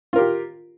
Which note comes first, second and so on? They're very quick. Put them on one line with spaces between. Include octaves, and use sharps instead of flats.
F4 A#4 G4